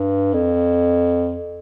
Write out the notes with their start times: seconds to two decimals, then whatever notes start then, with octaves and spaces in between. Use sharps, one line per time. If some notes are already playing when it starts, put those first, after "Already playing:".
Already playing: G2
0.33 F2